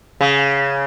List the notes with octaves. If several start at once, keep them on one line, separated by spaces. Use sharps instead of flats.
C#3